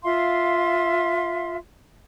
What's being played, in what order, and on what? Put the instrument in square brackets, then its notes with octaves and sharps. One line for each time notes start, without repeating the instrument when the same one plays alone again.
[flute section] F4 E5 F5 C6